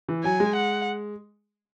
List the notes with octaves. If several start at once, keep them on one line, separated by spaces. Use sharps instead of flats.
E3
F#3 G#5
G#3
F#5